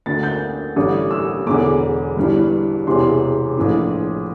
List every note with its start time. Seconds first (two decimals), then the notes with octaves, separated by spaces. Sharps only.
0.06 D2 D3 A6
0.23 G6
0.76 A1 G2 D3
1.11 E6
1.46 E1 E2 D3 D6
2.17 G1 G2 E3
2.87 E1 E2 C3 E3 C6
3.57 A#1 A2 E3